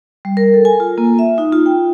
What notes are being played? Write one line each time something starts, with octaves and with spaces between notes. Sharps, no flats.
G3
A#4
A4
G#5
F4
A#3
E5
D#4
F4
G5